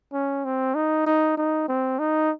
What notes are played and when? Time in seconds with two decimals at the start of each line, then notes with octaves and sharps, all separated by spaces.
0.13 C#4
0.45 C4
0.75 D#4
1.06 D#4
1.38 D#4
1.69 C4
1.99 D#4